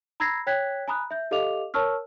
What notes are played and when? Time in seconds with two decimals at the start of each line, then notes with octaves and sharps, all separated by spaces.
0.20 A#5 B5 E6 G#6 A#6 C7
0.47 C#5 G5 F#6 G#6 B6
0.88 G#5 A#5 B5 D#6 F#6
1.11 E5 G6
1.31 G4 A4 D#5 F5 D6 F7
1.74 A#4 C#5 A5 C#6 E6 F6